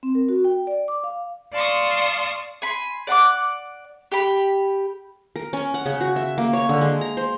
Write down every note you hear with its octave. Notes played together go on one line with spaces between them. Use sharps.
C4
A#4
F#4
G5
D5
D6
F5
D5 F5 A5 C6 C#6 D#6
G#5 B5 C6
D5 F#5 B5 D6
G4 B5
A#4
C#4
F#5
C#3
F#4
E5
A#3
C#5
D3
G#3
A#5
C5